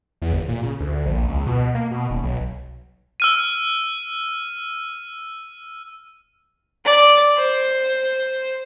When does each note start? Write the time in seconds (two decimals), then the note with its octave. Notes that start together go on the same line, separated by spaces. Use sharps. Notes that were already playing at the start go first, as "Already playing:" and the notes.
0.22 E2
0.33 G1
0.48 A#2
0.63 C#3
0.80 D2
1.05 A#1
1.28 C#2
1.47 B2
1.74 A#3
1.91 B2
2.10 D#1
2.23 B1
3.20 E6 F6 D#7
6.85 D5
7.38 C5